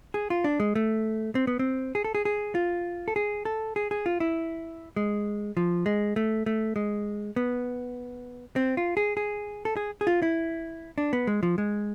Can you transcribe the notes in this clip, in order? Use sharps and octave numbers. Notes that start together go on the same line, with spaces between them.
G#4
F4
D4
G#3
A3
C4
B3
C4
G#4
A4
G#4
G#4
F4
A4
G#4
A4
G#4
G#4
F4
E4
G#3
F3
G#3
A3
A3
G#3
B3
C4
F4
G#4
G#4
A4
G#4
G#4
F4
E4
D4
B3
G#3
F3
G#3